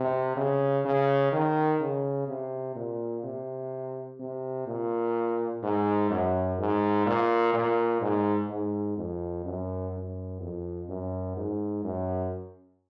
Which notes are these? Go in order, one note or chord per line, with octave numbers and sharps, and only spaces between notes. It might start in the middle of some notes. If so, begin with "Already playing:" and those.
Already playing: C3
C#3
C#3
D#3
C#3
C3
A#2
C3
C3
A#2
G#2
F#2
G#2
A#2
A#2
G#2
G#2
F2
F#2
F#2
F2
F#2
G#2
F#2